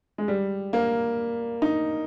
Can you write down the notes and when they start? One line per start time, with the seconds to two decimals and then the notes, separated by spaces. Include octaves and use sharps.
0.18 G#3
0.28 G3
0.73 A#3
1.62 D#4